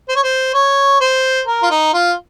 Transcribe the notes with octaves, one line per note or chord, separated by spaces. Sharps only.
C5
C#5
C5
C#5
C5
A#4
F4
D#4
F4